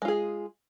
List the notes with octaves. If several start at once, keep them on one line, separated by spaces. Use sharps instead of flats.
G#3 F4 G#4